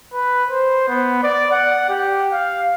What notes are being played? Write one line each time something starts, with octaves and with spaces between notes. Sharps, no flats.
B4
C5
B3
D5
F#5
G4
F5